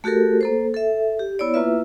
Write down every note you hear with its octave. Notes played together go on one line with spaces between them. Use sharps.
A3 F#4 G4 A4 A#4
A#3 A4 C5
A4 E5
G4
B3 E4 C#5 D5
A#3 E4 F4 B4 E5